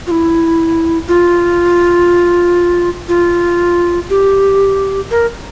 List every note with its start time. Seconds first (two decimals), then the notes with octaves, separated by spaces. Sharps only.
0.07 F4
0.11 E4
1.08 F4
3.09 F4
4.10 G4
5.11 A#4